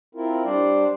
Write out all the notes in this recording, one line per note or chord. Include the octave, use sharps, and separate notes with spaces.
C4 E4 F4 A#4
G3 D4 C5 D5